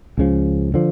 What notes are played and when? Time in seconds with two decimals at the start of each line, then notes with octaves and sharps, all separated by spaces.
0.18 C#2 C#3 F3
0.74 D3 F3